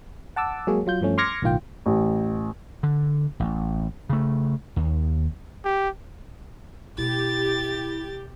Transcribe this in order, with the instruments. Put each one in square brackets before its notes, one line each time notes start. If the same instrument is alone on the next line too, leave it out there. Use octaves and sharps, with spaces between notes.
[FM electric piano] F#5 A5 D6 E6
F#3 G#3 A#3 G#4 C#5
F#3 F4 G6
G2 F3 A3 C#4
C6 D6 F6 G#6 A#6 C#7
B1 A2 D#3 F4 G5
[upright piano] A1
[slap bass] D3
A1
C#3 A3
D#2
[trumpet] G4
[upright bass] B2 A3 [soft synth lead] E4 [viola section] G4 [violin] A6